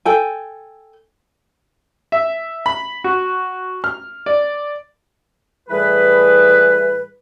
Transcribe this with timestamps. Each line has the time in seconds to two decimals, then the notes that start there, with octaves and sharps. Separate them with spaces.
0.05 A4 G5 G#5
2.12 E5
2.66 B5
3.04 F#4
3.84 F6
4.26 D5
5.69 A2 E3 G3 G#4 B4